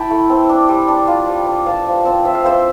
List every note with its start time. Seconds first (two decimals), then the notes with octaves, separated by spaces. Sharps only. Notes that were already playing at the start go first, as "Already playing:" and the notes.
Already playing: E4 G5 A5 B5
0.10 A3
0.29 C4
0.49 D4
0.69 G3
0.88 D4
1.07 F4
1.28 G3
1.46 D4
1.66 F3 F5 A5
1.86 F3
2.05 C4
2.25 F3 E5
2.35 F5
2.44 C4 C5 E5